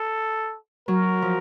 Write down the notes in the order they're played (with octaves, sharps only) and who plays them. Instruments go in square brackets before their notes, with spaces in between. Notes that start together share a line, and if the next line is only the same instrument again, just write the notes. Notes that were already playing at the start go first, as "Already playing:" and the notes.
Already playing: [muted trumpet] A4
[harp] F#3 [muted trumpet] A#4
[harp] F3